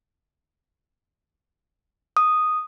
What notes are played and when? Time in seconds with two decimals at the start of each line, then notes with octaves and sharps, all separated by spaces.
2.17 D#6